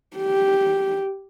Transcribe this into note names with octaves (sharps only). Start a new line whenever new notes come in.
G4